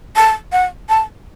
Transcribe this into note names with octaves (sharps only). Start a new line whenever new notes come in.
A5
F#5
A5